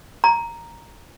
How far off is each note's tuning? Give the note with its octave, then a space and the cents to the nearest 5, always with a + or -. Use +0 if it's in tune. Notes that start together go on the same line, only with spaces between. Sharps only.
A#5 +0